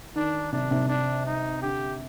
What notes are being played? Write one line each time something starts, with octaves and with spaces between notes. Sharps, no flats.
D#3 D4
C3 D4
C3
D4
D#4
D3 G4